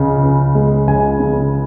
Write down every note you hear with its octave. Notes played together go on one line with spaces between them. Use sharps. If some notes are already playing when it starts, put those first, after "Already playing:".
Already playing: C#2 C#3
C#2
G#3
C#2 G#5
C#3